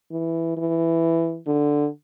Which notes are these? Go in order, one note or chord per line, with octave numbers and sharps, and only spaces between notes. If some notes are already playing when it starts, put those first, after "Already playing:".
E3
E3
D3